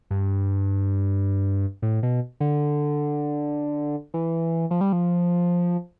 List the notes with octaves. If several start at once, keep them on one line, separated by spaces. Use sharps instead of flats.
G2
A2
B2
D3
E3
F3
G3
F3